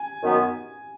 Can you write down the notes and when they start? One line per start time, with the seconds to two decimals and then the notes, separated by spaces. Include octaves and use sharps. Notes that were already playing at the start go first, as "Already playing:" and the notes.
Already playing: G#5
0.23 F#2 D#3 B3